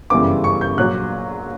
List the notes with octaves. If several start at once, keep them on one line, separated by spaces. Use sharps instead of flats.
G1 F#2 C#3 E3 G3 D6
C#6
G6
A#1 A#2 F#3 F#6